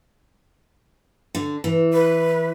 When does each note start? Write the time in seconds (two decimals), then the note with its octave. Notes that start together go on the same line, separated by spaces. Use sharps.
1.35 D3
1.64 E3
1.93 B4